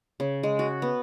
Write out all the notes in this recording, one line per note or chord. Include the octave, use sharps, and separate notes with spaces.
C#3
G#3
F#4
B3